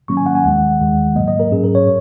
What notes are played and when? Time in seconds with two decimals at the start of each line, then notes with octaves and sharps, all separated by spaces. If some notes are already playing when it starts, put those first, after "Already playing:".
0.08 G#2 D#3 F#3 A#3 C#4 C#6
0.17 G#5
0.26 F#5
0.35 G#5
0.44 D#2 D#3 G#3 F#5
0.80 D#2 D#3 G#3
1.15 G#2 F#3 A#3 D#5
1.28 D#5
1.40 A#4
1.52 G#2 F#3 C#4 G#4
1.64 A#4
1.75 C#5